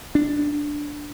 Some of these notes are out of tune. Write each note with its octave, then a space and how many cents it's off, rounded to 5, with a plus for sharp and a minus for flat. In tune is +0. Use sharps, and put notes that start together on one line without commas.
D4 +0